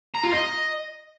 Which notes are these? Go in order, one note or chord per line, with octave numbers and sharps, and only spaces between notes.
A#5
F4
D#5